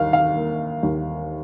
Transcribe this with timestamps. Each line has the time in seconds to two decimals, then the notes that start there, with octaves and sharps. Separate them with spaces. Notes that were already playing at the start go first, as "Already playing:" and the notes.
Already playing: D#2 D#3 F5
0.13 F5
0.36 A#3
0.83 D#2